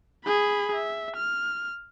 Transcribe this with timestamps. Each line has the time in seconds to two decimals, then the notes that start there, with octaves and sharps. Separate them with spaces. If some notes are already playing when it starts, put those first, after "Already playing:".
0.25 G#4 B5
0.74 E5
1.16 F6